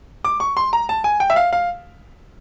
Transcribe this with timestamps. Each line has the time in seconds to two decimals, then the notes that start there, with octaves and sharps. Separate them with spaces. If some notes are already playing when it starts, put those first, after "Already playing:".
0.25 D6
0.40 C#6
0.57 C6
0.73 A#5
0.89 A5
1.04 G#5
1.20 G5
1.30 E5
1.36 F5
1.53 F5